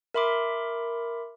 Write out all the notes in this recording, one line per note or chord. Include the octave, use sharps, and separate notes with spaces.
A#4 E5 B5 C6 D6